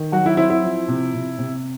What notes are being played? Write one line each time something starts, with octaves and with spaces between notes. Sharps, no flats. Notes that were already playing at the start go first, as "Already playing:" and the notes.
Already playing: D#3
F#3 F#4
E4
C4 E4
E4
F3
C3
C3
C3